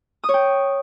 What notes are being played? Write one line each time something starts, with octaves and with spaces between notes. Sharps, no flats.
D#6
C#5
G5